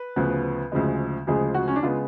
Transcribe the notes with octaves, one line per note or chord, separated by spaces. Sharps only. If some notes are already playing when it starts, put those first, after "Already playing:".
Already playing: B4
D2 C#3 F3 B3
D2 C#3 F3 G#3
D2 C#3 F3 G#3 G#4
F#4
C#4
D4
C#3 G#3 B3 F4